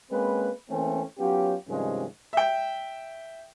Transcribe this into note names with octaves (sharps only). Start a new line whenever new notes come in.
G#3 A#3 C4 C#4 B4
E3 A3 A#3 C4 C#4
F#3 B3 C#4 F4 G4
G2 C3 D#3 F3 G#3 C#4
E5 G5